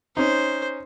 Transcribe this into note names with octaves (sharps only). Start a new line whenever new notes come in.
C#4 D#4 C5